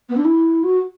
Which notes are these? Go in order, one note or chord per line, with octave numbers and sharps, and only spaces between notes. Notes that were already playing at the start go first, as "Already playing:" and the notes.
B3
D4
E4
F#4